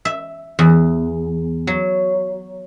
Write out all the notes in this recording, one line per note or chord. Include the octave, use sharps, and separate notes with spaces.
E5
E2
F#3